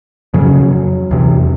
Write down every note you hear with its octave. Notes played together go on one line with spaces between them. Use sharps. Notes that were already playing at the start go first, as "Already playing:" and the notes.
F2 C#3 F#3
E2 C3